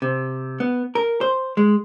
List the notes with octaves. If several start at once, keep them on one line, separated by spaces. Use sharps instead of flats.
C3
B3
A#4
C5
G#3